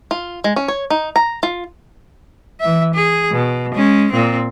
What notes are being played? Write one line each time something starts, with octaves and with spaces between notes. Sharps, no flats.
F4
G#3
C#4
C#5
D#4
A#5
F4
E3 E5
G#4
B2
G#3 C#4
A#2 C4